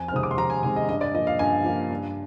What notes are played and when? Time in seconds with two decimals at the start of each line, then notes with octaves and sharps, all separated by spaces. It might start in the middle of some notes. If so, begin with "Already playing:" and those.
Already playing: F2 G#5
0.08 F6
0.12 C3 D#3 G#3 C4 D#6
0.23 D6
0.31 C6
0.37 F2 A#5
0.50 G#5
0.63 C3 D#3 G#3 C4 G#5
0.76 D#5
0.89 G2 D#5
1.01 D5
1.14 F3 A#3 D#5
1.27 F5
1.39 G2 G#5
1.64 F3 A#3
1.90 G2